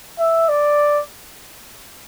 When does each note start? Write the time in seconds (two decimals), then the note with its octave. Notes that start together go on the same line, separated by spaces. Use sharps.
0.19 E5
0.49 D5